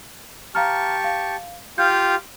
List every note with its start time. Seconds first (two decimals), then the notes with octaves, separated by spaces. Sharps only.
0.55 G4 F5 A5 A#5 C#6 F6
1.04 F5
1.78 F4 G4 F5 G6